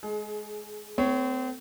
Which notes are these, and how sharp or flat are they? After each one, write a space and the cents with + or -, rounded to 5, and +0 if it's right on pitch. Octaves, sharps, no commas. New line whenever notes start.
G#3 +15 G#4 +35
A3 +25 C4 -35 C#5 +0